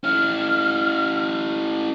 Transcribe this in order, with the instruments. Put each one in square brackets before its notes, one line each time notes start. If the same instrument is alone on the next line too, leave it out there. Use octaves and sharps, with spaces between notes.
[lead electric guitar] C#4 E4 [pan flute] F6